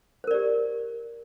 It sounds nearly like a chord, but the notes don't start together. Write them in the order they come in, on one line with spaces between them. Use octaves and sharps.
C5 A#4 D5 G4